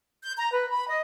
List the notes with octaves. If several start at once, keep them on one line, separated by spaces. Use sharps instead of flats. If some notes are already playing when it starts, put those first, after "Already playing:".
G6
A#5
B4
B5
D#5